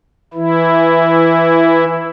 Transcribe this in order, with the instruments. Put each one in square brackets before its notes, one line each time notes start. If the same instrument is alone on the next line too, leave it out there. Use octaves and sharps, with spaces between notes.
[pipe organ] E3 E4